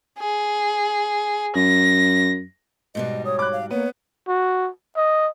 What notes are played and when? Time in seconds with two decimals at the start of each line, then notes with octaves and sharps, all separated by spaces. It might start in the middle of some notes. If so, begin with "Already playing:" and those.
0.19 G#4
1.56 F#2 A#6
2.95 G#2 B2 G3 D#5
3.25 C#5 D#6
3.39 B5 D6 F#6
3.52 F5
3.71 A#3 B3 C#5
4.28 F#4
4.96 D#5